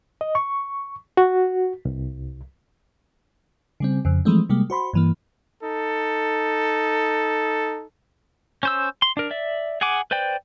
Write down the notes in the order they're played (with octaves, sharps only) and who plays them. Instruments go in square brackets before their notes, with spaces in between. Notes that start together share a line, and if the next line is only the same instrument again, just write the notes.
[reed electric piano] D#5
C#6
F#4
C2
[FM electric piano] C#3 G3 C4
F2 C#3
E3 F3 G#3 A3 C4
C3 G3 G#3 A#3
F#4 C5 B5 C6
G2 E3 A#3
[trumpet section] D#4 A4
[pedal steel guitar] C#4 C5 E6
C6
D4 A#4
D5 E5
G#4 F#5 G#5 D6
B4 C5 D5 G5